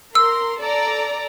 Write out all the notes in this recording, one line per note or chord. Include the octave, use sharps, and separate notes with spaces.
A#4 C6 E6
A4 D5 A#5